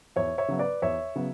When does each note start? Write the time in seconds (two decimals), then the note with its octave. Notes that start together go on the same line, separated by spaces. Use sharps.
0.16 E2 C#5 E5
0.38 C#5 E5
0.48 C#3 F#3 B3
0.59 B4 D5
0.82 E2 C#5 E5
1.15 C#3 F#3 B3